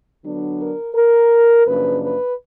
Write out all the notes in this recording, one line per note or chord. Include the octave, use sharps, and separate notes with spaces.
D3 F#3 B3 D4
A#4
A#4
F#2 C#3 F3 A#3 D4 B4
B4